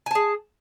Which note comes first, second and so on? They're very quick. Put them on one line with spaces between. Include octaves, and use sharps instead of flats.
G#5 A5 G#4